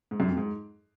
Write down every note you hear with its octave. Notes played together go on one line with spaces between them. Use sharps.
G#2
F#2
F2
G#2